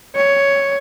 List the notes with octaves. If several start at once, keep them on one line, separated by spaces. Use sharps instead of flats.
C#5